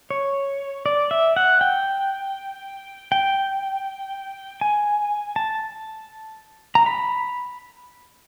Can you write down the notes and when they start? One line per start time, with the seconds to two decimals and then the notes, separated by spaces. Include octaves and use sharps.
0.10 C#5
0.86 D5
1.11 E5
1.36 F#5
1.61 G5
3.12 G5
4.61 G#5
5.36 A5
6.75 A#5
6.86 B5